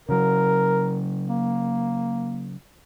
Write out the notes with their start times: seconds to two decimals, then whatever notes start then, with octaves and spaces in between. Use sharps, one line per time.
0.09 C#3 F#3 A#4
1.28 A#3